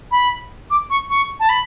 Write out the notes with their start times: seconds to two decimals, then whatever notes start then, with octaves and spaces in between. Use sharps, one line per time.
0.11 B5
0.70 D6
0.90 C#6
1.10 C#6
1.40 A5
1.49 B5